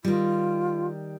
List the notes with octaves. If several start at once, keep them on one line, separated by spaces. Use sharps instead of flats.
D#3 G3 F4